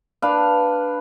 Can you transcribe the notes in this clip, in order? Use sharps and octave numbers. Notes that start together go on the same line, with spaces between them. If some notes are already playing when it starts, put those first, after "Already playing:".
D4 B4 F5